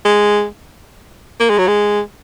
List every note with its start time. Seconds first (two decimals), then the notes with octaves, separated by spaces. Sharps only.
0.05 G#3
1.40 A#3
1.50 G#3
1.58 F#3
1.68 G#3